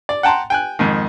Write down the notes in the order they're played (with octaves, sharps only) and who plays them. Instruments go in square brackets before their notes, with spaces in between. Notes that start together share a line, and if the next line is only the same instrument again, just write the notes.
[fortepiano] D5
F#5 G5 A5 A#5 C6
G5 G#5 F#6
F2 G#2 D#3